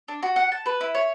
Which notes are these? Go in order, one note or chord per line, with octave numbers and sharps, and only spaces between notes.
D4
F#4
F#5
A5
B4
E4
C#5